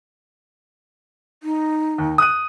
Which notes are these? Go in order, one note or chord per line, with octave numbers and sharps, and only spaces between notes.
D#4
D#2
D#6 F#6 D#7